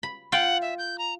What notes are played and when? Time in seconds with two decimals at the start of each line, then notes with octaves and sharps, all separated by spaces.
0.03 B5
0.32 F4 F#5 G5
0.62 E5
0.78 G6
0.98 A#5